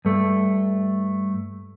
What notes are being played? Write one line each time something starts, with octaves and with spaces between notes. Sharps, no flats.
G2 A3